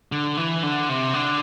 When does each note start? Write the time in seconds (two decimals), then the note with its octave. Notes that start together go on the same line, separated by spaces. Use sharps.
0.12 D3
0.37 E3
0.63 D3
0.89 C3
1.14 D3